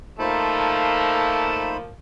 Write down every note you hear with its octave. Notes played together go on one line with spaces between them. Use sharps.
F3 A3 A#3 D#4 C5 A5 B5